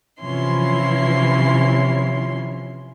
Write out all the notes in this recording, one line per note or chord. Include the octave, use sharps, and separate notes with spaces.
C3 E3 F3 C#4 E4 C6